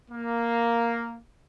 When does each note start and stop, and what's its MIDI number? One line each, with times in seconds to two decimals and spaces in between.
0.10 1.19 58